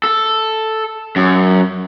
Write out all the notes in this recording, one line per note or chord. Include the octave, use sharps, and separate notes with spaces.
A4
F#2